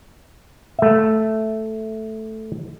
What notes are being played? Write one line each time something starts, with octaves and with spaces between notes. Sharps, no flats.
A3 E5